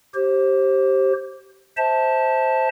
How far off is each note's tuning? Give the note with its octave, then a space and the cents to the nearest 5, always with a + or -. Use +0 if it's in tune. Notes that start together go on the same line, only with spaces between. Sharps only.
G4 -15 C5 +25
C5 +0 E5 -35 A5 +0